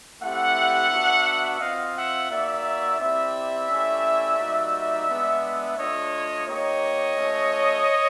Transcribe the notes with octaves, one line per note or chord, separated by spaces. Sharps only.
A3 C4 E4 G4 E5 F#5
B3 D4 F#4
C4 F4 D#5 F5
E5 F#5
A#3 D#4 F#4 D5 E5
C4 E4 G4 D5 E5
A3 C#4 E4 G4
G3 A#3 D#4 F#4
G#3 B3 D4
A3 D4 F4 C#5 D#5
A#3 D#4 G4 C#5 D#5
A3 C#4 F4